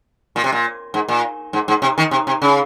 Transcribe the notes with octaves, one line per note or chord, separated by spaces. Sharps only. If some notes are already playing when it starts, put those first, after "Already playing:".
A#2
C3
A#2
G#2
A#2
G#2
G#2
C3
D#3
C3
C3
C#3